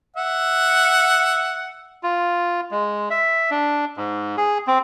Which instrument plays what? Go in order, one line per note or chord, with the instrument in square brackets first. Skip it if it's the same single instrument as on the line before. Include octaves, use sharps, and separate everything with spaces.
[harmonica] E5 F#5
[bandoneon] F4
G#3
E5
D4
G#2
G#4
C4